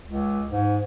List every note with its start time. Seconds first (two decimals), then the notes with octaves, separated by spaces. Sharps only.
0.07 C#2
0.51 G#2